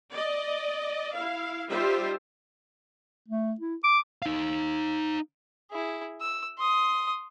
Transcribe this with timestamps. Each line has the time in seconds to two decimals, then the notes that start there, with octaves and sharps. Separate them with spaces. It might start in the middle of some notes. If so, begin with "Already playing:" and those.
0.12 D5 D#5
1.13 E4 F5
1.70 G3 D#4 F4 G4 C5 E5
3.28 A3
3.60 E4
3.83 D6
4.22 D#4 F5
5.71 E4 G#4
6.22 E6
6.58 C6 D#6